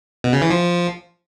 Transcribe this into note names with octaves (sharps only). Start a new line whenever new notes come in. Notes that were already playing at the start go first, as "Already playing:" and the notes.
B2
C#3
E3
F3